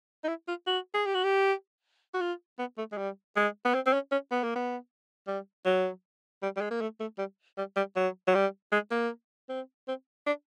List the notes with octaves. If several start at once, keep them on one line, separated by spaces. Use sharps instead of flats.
D#4
E4
F4
F#4
G#4
G4
F#4
G4
F#4
F4
B3
A3
G#3
G3
G#3
B3
C4
C4
C#4
C#4
B3
A#3
B3
G3
F#3
G3
G3
G#3
A#3
A3
A3
G3
G3
G3
F#3
F#3
G3
G#3
A#3
C4
C4
D4